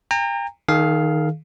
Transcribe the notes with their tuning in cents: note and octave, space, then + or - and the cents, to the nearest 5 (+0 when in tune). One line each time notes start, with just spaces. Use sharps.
G5 +40 A#5 -20
D#3 +0 G#4 +40 F5 +0